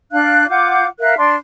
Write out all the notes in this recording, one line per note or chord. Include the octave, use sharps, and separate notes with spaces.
D4 F5 F#6
F4 F#5 D6 G6
A#4 E5 F5 F#6
D4 C6